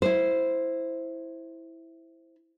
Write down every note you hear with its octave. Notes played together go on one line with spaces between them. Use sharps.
E4 C5